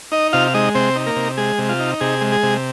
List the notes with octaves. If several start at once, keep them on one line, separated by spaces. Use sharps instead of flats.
D#4 D#5
C3 F4 F5
F5
G#3 D#4 D#5
C3 C4 C5
D#4
A#3 A#4
C3
G#3 G#4
C3
F4
D#4
C3 G#4
G#3
G#4
C3